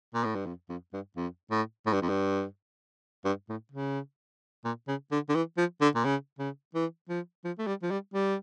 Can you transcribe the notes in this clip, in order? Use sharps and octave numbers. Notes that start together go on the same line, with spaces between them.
A#2
A2
G2
F2
F2
G2
F2
A2
A2
G2
F2
G2
G2
A2
C#3
A#2
C#3
D3
D3
E3
F3
D3
A#2
C#3
C#3
E3
F3
F3
A3
G3
F3
G3
G3